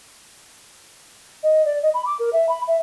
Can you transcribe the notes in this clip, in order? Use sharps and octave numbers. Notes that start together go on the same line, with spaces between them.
D#5
D5
D#5
B5
D6
A#4
E5
B5
E5